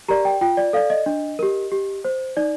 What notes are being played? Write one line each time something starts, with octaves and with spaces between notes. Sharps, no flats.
G4 A#4 D5 A#5
G5
F4 G5
D5
A4 D5 F5
D#5
D4
G4 A#4
G4
C5
D#4 D5